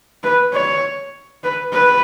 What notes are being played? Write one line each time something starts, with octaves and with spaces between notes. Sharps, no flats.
B4
C#5
B4
B4